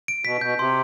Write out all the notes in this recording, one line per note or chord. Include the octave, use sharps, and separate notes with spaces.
D7
B2 B6
B2 G6
C3 C6